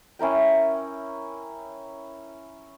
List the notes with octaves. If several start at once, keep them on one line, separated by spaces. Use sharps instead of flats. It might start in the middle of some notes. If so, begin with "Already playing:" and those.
C#4 E4 A#4 G5